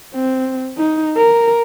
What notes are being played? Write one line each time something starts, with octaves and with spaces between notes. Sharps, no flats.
C4
D#4
A#4